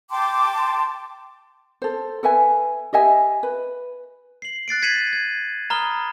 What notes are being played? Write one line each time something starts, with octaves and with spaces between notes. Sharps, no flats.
G5 A5 C6 D6
A4 C5
A4 B4 E5 G#5
G4 D#5 E5 G#5
B4
C7 F#7
F#6 A6 C7 D7
G#6 B6 C#7 D#7 E7 F#7
G#6
A#5 B5 D#6 F6 G7